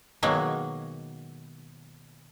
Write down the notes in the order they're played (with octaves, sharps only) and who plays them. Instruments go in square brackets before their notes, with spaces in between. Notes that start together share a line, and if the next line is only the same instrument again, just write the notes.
[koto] B2 D#3 F#3 G#3 A#3